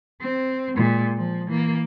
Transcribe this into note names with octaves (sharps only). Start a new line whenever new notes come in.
C4
A#2 G#3
F3
E3 A#3